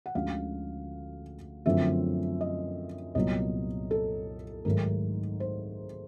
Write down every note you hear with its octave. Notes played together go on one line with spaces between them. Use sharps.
F#5
D2 D3 F3 G#3 C#4 F5
F#2 D3 F3 A3 C4 E5
D#5
C2 A#2 F#3 B3 D#5
A4
G#2 D#3 F#3 A3 A#4
C5